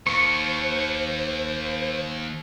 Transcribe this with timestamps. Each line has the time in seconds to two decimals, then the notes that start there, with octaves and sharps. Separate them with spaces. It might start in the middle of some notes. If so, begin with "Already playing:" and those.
0.07 D#2 C5 C#6